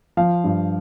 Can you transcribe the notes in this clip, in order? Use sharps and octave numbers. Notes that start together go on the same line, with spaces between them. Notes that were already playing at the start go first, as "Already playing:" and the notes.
F3 F5
G2